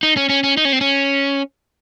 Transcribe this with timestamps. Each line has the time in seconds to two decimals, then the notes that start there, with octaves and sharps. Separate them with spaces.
0.03 D#4
0.17 C#4
0.29 C#4
0.44 C#4
0.57 D#4
0.65 C#4
0.73 C4
0.81 C#4